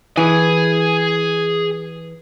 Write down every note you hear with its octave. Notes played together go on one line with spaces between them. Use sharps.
E3 G#4 G#5